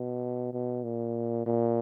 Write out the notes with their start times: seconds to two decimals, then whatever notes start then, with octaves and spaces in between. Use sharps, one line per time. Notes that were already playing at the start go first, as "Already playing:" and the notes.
Already playing: B2
0.53 B2
0.84 A#2
1.47 A#2